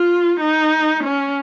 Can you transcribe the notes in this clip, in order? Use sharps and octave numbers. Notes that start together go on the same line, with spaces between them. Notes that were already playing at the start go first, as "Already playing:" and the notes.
Already playing: F4
D#4
C#4